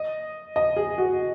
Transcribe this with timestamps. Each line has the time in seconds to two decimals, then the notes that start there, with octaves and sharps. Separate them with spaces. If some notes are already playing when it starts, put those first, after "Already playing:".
Already playing: D#5
0.56 D#5
0.77 G#4
0.98 F#4